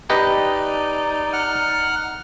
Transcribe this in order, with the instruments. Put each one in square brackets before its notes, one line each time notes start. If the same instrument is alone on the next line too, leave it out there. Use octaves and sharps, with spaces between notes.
[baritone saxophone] D#4 [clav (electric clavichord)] G4 B4 D#5 [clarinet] D5
[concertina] F#5 F6